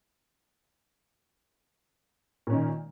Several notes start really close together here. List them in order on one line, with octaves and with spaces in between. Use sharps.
A#2 C#4 D#3